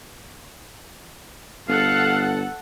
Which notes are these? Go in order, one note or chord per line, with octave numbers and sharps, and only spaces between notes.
G1 A4 F5 F#5